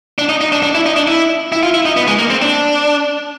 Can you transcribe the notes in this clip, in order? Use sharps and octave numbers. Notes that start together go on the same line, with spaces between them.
D4
D#4
D#4
D4
D4
E4
D#4
D4
E4
E4
F4
E4
D#4
B3
G#3
A#3
C4
D4